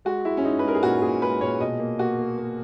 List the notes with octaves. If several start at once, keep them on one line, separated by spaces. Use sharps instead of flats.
G#3 F#4
G#3 E4
C#4
G#3 D#4
B4
G#3 A#4
G#4
A#2 F#4
A#2 G#4
G#3 B4
A#2 C#5
B2 D#5
A#3
A#3 F#4
A#3
A#3